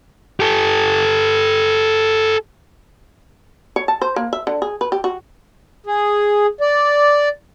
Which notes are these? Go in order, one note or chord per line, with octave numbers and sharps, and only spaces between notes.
G4 A4
C#5
A5
C5
A#3
E5
D3
G#4
B4
G4
F#4
G#4
D5